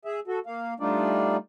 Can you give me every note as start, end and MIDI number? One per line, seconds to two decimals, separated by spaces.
0.05 0.20 68
0.05 0.20 76
0.27 0.39 66
0.27 0.39 69
0.46 0.74 58
0.46 0.74 77
0.80 1.37 55
0.80 1.37 57
0.80 1.37 62
0.80 1.37 63
0.80 1.37 65
0.80 1.37 74